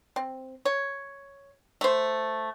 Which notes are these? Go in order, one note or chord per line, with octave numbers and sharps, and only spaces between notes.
C4
C#5
A3 C5